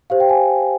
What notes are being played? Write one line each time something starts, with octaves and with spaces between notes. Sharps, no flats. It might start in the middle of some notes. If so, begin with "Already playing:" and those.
G4 C5 F5
G5
G#5